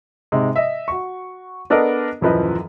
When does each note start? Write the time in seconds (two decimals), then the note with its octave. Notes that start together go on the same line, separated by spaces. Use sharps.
0.32 G#2 C3 G#3
0.56 D#5 E5
0.88 F#4 C#6
1.70 B3 D4 A4 A#4 D#5
2.21 D#1 F#2 E3 F3 B4 D#5